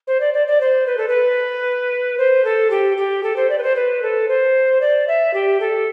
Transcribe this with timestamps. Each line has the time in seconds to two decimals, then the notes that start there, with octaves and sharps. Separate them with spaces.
0.07 C5
0.20 D5
0.33 D5
0.47 D5
0.60 C5
0.86 B4
0.97 A4
1.08 B4
2.18 C5
2.44 A4
2.70 G4
2.97 G4
3.23 A4
3.36 C5
3.49 D5
3.58 B4
3.63 C5
3.76 B4
4.02 A4
4.28 C5
4.81 D5
5.07 E5
5.33 G4
5.60 A4